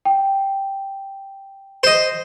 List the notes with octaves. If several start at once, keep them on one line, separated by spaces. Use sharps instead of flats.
G5
C5 D#5